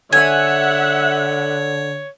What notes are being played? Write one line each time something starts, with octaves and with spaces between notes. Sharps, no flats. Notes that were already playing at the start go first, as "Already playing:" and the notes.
D3 C#5 E5 F#5 G#5